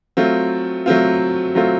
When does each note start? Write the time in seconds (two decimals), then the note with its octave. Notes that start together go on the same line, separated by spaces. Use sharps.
0.17 F#3 A3 C4 F4
0.86 F#3 A3 C4 F4
1.55 F#3 A3 C4 F4